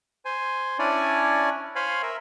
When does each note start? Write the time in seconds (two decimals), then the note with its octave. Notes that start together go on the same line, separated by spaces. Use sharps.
0.25 C5 G#5
0.79 C#4 D4 E4 C#5 D5 G#5
1.75 C5 C#5 F5 G#5 B5
2.02 A#4 E5